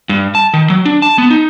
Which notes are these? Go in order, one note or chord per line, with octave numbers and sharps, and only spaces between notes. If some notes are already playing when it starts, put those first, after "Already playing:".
G2
A5
D#3
F#3
D4
A5
B3
D#4